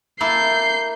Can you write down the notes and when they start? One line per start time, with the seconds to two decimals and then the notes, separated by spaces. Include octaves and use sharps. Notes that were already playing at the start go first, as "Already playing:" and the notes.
0.21 A#3 E4 A4 G6 C7